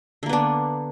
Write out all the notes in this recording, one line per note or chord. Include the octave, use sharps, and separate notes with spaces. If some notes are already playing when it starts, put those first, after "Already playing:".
D3 A#3 B3 D4